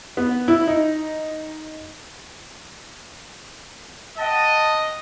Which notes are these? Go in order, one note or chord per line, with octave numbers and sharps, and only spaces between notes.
B3
E4
D#4
D#5 F#5 G5 A5